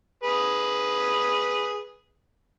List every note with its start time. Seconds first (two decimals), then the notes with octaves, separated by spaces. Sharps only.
0.24 G#4 B4